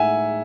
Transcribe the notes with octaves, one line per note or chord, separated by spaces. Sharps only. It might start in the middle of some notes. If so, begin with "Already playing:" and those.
Already playing: A2 G#3 D#4 E5 F#5 G#5